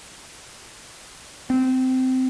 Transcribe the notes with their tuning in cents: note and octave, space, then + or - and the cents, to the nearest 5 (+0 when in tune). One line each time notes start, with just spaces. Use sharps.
C4 -20